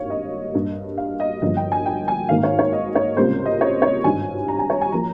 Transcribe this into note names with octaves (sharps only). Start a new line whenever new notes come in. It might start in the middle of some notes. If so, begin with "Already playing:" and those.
Already playing: G#1 G2 G3 A#3 C#5 F5
D#5
G2 G3 A#3
F5
D#5
G1 G2 F3 A#3 D#5
G5
G#5
G5
G#5
G#1 G#2 D#3 A#3 F5
C#5
C#5
D#5
C#5
C#2 C3 G3 A#3 C5
D#5
C#5
C#5
G#1 G2 G3 G#5
A#5
G#5
C#5
G#5
F3 A#3 A#5